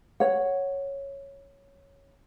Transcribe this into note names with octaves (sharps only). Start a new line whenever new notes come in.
C#5 F#5